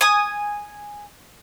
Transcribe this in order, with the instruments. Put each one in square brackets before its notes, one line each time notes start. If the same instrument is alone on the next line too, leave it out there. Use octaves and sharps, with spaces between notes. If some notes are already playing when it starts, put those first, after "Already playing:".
[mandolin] G#5 D#6